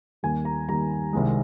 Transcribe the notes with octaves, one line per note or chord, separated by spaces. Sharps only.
D#2 D#3 G3 G#5
A#5
D#2 D#3 G3 A#5
C2 C3 D#3 G#3